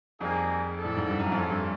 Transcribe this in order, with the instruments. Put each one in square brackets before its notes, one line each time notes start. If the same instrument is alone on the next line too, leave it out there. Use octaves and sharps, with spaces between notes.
[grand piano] F2 [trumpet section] G3 A#3 D#4 G#4
[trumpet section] E4 A4 D5
[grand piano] A2
G#2
G2
F#2
[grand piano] F2 [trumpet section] A3 C#4 F4 A4
[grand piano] G2